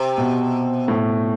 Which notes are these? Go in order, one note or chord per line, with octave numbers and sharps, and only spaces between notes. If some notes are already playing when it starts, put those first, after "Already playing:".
Already playing: C3
B2
A2